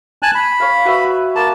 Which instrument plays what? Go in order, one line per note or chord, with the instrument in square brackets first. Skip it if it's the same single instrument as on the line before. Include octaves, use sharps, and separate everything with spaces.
[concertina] G#5 A5 F#6
B5
[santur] C#5 F5
F#4 B4 E5
[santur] A#3 [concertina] A5